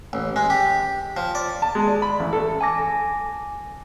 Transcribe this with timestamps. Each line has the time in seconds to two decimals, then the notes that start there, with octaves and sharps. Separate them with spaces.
0.13 A1
0.36 G#3
0.50 G4
1.17 F3
1.35 D5
1.62 A5
1.75 G#3
1.87 D5
2.02 B5
2.19 A1
2.33 A4
2.61 G#5 A5 D6 A#6